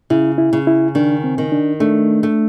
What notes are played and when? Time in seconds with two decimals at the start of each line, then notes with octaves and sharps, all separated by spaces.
0.10 C#3 E4
0.38 E4
0.53 C#3
0.67 E4
0.95 D#3 D4
1.24 C4
1.38 D#3
1.52 D4
1.80 A3 D4
2.23 A3